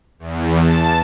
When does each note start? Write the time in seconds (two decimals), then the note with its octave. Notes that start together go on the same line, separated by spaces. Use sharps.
0.19 E2
0.62 A5